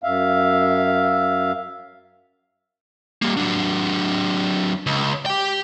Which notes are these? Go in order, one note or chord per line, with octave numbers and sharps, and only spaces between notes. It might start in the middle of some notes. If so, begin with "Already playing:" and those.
F#2 E5 F5
G3 A#3
F#3 D4
C#2
G4 G5